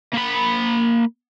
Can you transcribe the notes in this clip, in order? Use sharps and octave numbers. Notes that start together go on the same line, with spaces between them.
A#3 B5